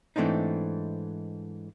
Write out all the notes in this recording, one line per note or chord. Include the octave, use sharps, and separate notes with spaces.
G#2 E3 A3 C4 D4 D#4